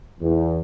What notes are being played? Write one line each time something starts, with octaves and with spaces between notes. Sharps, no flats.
E2